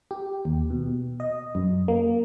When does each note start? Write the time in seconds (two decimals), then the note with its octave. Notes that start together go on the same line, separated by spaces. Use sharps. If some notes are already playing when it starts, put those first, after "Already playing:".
0.11 G4
0.45 D#2
0.70 B2
1.20 D#5
1.55 F#2
1.88 A#3